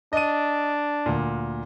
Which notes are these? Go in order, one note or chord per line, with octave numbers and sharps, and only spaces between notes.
D4 D#5 D#7
D2 A#2